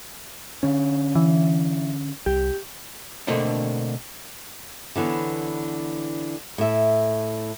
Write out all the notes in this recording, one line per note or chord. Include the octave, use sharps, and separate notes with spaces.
D3 C#4
E3
C2 G4
B2 D3 A3 A#3 C4 D4
D3 E3 B3 C#5
A2 E5